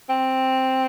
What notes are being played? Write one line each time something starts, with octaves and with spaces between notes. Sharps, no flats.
C4